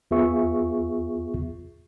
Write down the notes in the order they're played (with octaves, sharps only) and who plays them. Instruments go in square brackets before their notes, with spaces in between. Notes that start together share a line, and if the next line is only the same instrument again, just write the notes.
[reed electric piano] E2 B3 F4 G#4 E5 C#6